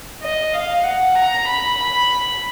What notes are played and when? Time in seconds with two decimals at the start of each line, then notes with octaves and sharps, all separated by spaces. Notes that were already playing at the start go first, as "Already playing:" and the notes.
0.22 D#5
0.54 F5
0.84 F#5
1.15 A#5
1.46 B5
1.77 B5